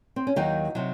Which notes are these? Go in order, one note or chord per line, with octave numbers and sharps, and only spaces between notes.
C4
C#4
D#2 D#3 F#3 D#4
C3 F#3